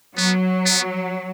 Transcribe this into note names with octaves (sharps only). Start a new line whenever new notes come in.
F#3 B3
B3